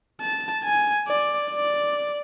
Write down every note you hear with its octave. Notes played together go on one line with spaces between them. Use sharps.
A5
G#5
D5
D5